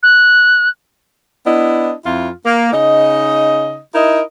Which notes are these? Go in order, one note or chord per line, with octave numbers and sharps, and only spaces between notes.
F#6
B3 D4 E4 D#5
F2 E4 F4
A#3
C#3 D#4 D#5
D#4 E4 A#4 D#5